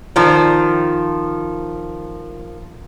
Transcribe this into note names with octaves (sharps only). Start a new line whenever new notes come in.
D#3 F3